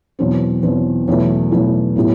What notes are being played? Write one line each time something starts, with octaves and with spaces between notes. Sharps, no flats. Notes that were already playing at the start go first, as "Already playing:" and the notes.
E2 B2 F#3 C4
E2 B2 F#3 C4
E2 B2 F#3 A3 E4
E2 B2 F#3 A3 E4
A2 F#3 B3 E4 G4